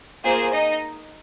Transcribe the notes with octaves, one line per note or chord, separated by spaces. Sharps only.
A#3 F4 G#4 C5
D#4 D#5